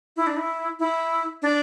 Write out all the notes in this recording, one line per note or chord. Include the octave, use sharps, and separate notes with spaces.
E4
D4
E4
E4
D4